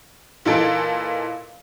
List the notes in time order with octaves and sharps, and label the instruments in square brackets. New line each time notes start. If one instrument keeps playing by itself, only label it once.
[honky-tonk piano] A#2 E3 D#4 A4 D7